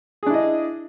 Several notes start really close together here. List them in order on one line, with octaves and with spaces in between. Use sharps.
G#4 D4 E4 D#5